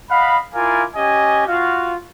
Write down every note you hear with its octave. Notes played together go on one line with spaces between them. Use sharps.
D#5 F5 F#5 B5
E4 F4 A#4 D5 F5 G#5
C#4 G4 D#5 G#5
F4 F#4 F5